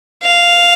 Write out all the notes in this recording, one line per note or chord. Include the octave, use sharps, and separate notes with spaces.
F5